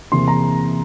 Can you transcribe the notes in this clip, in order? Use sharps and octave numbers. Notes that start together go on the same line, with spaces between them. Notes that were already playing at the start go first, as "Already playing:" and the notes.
E2 C3 E3 A#3 C6
A#5